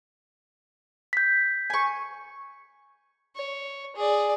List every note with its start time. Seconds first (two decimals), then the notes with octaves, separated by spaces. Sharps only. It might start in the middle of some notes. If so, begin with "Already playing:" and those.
1.13 G6 B6
1.70 G#5 C#6
3.35 C#5
3.96 G#4 D5